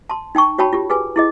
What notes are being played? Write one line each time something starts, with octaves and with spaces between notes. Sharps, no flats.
A5 C6
D#4 G5 A5 C#6
F#4 C#5 G5 A5 B5
F4 G4
G#4 B4 G#5
E4 G#4 D#5